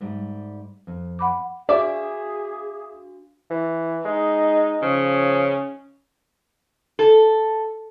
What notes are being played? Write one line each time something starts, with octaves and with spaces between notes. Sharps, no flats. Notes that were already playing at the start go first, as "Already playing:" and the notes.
G#2 G3 A3
F2
F#5 B5 D6
D4 F#4 G#4 D5 E5 F5 D6
E3
G#3 D#4
C#3 F3 C#4
A4